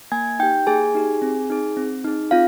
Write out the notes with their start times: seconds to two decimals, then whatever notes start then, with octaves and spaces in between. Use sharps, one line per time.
0.12 A#3 G#5 G#6
0.39 D#4 G4 G5 G6
0.67 A#3 G#4 G#5
0.95 D#4 G4
1.22 C4
1.50 D#4 G#4
1.77 C4
2.04 D#4 G#4
2.31 C4 F4 F5